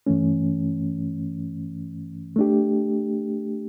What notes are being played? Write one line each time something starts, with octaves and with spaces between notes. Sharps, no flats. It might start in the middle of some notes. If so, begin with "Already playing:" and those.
G2 E3 A3 C#4
A3 D4 G4